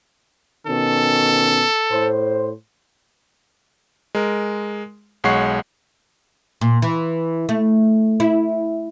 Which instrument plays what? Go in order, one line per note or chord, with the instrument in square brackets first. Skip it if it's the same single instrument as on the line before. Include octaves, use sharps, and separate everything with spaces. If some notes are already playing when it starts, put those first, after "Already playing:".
[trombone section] B2 D#3 C#4 [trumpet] A4
[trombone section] A2 C5
[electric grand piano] G#3 A#4
B1 G#3 C#5 F#5 C#6 C7
[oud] A#2
E3
A3
E4